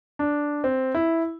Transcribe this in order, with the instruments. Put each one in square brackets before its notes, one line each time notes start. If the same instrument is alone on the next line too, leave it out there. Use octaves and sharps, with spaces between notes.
[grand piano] D4
C4
E4